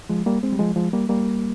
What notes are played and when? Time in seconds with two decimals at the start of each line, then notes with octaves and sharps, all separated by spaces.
0.09 F3 G#3
0.26 G3 A#3
0.43 G#3 C4
0.53 G3
0.59 F3 G#3
0.76 F3 G#3
0.93 G3 A#3
1.09 G3 A#3